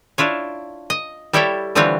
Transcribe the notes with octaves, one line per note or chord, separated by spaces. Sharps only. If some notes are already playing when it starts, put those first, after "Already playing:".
D4 E4 F4 C#5
D#5
G3 E4 G4 A4 C#5 G5
D3 E3 G3 C4 F4 C#5